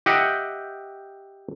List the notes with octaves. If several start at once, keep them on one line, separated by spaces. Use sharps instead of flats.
G4 D#5 E5 F#5 G5